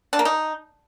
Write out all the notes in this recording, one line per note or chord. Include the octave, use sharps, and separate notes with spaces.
D4
A#3
D#4